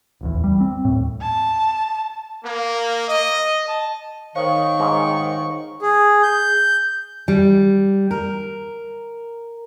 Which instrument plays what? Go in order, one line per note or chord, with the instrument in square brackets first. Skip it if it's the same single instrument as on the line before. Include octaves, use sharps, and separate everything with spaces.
[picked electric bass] D1 A1 E2
G3
C4
D#2 A2
[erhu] A5
[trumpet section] A#3
D#5
A5
[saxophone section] D#3 [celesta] C5 C#5 F5 [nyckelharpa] C#6
[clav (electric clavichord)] G#2
[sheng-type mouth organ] G#4
G6
[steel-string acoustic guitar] G3
A#4